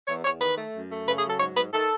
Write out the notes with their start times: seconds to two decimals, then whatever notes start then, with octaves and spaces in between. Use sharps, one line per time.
0.08 E2 C#5
0.25 E2 C#5
0.41 D#3 B4
0.58 A3
0.74 F#2
0.91 A3
1.07 C#3 B4
1.18 G#4
1.24 F#3
1.29 A4
1.40 G#2 C#5
1.56 G#2 B4
1.74 D#3 A4